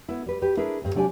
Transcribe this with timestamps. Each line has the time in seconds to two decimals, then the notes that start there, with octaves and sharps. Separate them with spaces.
0.09 B3 E4
0.26 G3 B4
0.42 G4 B4
0.57 D4 E4 G#4 A#4 B4
0.82 D2 G2
0.95 C3 F#3 D4 G4 G#5